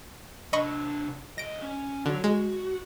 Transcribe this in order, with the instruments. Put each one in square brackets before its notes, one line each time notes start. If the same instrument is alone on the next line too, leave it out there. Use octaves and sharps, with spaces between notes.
[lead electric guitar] C3 D4 [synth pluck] D#5 B5 C#6
[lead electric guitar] D2 D#5 [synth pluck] A#6 D7
[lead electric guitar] C#4
[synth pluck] D3 [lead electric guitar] F#4 C#5
[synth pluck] G#3 [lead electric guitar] F#4